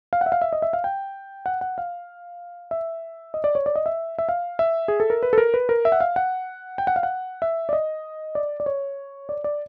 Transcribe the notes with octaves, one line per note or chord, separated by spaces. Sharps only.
F5
F#5
E5
F5
E5
D#5
E5
F5
G5
F#5
F#5
F5
E5
D#5
D5
C#5
D5
D#5
E5
E5
F5
E5
G#4
A4
A#4
B4
A4
A#4
B4
A#4
E5
F#5
F5
F#5
G5
F#5
F5
F#5
E5
D5
D#5
D5
D5
C#5
D5
D5